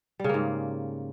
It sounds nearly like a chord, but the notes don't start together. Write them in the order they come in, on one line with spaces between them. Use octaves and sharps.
G3 C#3 A#3 G#2